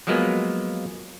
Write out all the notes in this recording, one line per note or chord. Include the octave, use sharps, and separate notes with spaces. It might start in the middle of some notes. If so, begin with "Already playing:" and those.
F3 F#3 G#3 A#3 B3